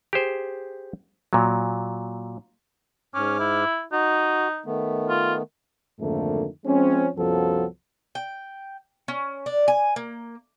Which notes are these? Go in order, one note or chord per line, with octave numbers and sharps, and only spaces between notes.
G4 G#4 C5
A#2 F#3
G#2 C#4 D6 F6
E4
D#4 F#4
D#3 A3 B3
F4
F2 G#2 D3 D#3 A3 A#3
F3 G#3 C4 C#4
C2 F#2 F3 F#3 B3 A4
G5
C#4
D4
G#5
A#3